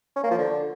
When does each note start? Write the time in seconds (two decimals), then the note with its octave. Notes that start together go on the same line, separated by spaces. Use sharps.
0.16 C#4
0.23 A#3
0.31 F3
0.38 D3